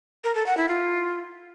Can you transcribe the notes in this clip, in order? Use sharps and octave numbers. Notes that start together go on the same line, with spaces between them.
A#4
A4
F#5
E4
F4